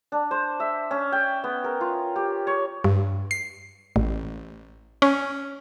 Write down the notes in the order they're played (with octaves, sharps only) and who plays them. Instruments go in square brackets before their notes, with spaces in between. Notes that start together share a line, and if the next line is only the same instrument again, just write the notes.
[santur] D4
C5
E5
C#4
G5
B3
A#4
F4
G4
C#5
[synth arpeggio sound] G2
C7
A1
C#4